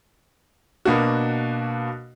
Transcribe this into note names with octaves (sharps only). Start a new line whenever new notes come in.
B2 A#3 D4 F#4